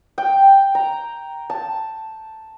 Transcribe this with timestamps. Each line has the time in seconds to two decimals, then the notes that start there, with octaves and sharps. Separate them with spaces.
0.18 G5
0.75 A#5
1.50 A5